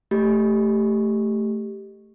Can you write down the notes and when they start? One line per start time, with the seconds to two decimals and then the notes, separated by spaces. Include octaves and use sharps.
0.11 A3 G4